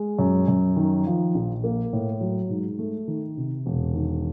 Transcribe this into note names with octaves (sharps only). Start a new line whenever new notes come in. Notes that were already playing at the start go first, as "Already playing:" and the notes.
Already playing: G#3
F#2
F#2
D#3
F3
A#1
A#3
A2
F#3
G#2
A3
D#3
C3
E1
D#3